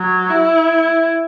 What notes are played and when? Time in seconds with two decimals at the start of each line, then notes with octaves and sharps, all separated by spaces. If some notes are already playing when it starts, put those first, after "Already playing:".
Already playing: F#3
0.30 E4